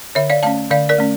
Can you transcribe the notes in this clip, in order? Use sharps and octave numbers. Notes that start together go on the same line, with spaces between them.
D3 C#5 E5
D5 F5
A3 C#4 F5 A5
D3 D5 F5
A#4 D5
A3 C#4